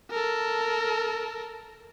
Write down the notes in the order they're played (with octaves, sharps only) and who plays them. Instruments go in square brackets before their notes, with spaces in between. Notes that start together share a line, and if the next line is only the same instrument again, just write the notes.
[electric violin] A4 A#4